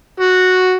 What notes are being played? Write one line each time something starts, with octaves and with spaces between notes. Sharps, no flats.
F#4